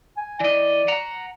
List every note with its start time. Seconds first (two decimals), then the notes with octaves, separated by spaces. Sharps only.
0.17 G#5
0.40 E3 D5 D#5
0.88 F#5 A#5